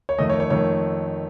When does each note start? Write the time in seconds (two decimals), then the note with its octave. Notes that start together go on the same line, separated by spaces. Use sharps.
0.09 C#5
0.18 F2 D#3 A3 D#5
0.29 C#5
0.40 C#5
0.50 F2 D#3 A3 C#5